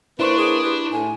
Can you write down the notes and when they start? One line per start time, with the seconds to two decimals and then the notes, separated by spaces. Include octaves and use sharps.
0.20 A#3 D4 E4 B4 C5 C6 C#6
0.38 G#4
0.64 G4 B4
0.92 A2 G#5